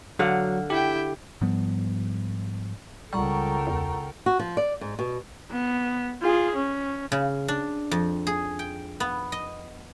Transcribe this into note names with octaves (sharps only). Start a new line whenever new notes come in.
D3 F#3 F5 F#5
E4 G4 G5
G#2 F3 G3 B3
C#2 G3 A4 A#4 F#5 G5 A#5 C#6
E2
F#4
F3
D5
G#2
B2
B3
F4 G#4
C#4
C#3
D4
F2
G#4
G5
B3
D#5